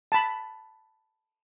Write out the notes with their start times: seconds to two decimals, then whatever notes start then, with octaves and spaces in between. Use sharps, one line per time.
0.12 A5 B5